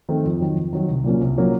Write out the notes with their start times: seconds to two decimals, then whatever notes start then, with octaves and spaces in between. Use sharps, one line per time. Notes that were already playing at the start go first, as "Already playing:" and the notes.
0.09 D#3 A3 C4
0.25 F2
0.40 D#3 F#3
0.56 F2
0.73 D#3 F#3
0.89 C2
1.04 A#2 F#3 A#3 C#4
1.21 C2
1.36 A#2 F#3 A#3 C#4